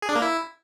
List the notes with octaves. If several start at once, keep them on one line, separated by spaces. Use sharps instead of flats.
G#4
D4
A#3
E4